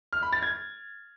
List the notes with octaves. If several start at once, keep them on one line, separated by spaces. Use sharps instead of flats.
F6
B5
A6
G#6